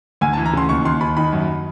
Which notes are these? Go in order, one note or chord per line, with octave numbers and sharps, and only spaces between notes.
D2 G#5
A5
E3
A#5
C#3 C6
D#2 C#6
D#2 C6
D#2 B5
D#3 B5
F#2